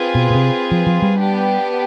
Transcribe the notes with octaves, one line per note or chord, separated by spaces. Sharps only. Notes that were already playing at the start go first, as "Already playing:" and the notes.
Already playing: C4 F4 G#4 B4
B2
B2
C3
F3
F3
G3
B3 D4 G4